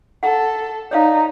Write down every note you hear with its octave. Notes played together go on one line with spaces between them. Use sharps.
A4 F#5
D#4 C#5 D5 F5